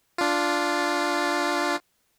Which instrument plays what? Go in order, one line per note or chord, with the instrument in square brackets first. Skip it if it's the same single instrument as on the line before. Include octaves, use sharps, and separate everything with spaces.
[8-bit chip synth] D4 F4